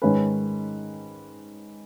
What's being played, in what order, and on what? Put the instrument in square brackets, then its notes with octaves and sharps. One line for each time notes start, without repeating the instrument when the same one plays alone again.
[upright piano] G#2 D#3 G#3 C#4 B4